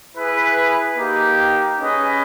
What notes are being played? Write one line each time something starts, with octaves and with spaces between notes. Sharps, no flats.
E4 G#4 B4
A#3 D#4 G4
C#4 G#4 B4 D#5